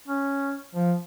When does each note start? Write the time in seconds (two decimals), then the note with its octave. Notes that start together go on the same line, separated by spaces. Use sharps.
0.08 C#4
0.75 F3